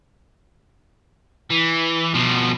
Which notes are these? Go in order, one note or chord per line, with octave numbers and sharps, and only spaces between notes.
E3
B2 F3